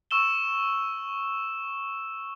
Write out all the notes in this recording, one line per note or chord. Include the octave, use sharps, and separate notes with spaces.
C#6 E6 E7 G7